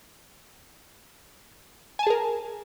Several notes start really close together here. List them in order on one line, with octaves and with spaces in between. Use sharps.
G#5 A5 G#4 A#4